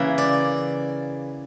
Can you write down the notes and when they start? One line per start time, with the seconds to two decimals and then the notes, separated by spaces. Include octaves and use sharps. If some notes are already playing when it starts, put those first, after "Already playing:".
Already playing: C#3 E3 A#3
0.18 D5